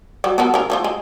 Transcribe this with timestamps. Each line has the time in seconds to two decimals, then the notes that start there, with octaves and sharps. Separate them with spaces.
0.24 F#3 G3
0.38 B3 A4 A#4
0.54 C#3 A#4
0.70 A3 D4 F4
0.84 G#3